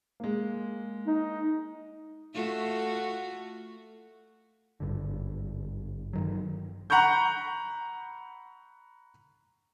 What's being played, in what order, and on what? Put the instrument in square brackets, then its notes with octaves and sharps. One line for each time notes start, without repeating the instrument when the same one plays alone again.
[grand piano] G#3 A#3
[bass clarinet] D#4
[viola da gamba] A3 F4 F#4
[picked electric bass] G#1 G2 D3
G2 D#3 F#3
[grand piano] F#5 A#5 B5 C#6 G6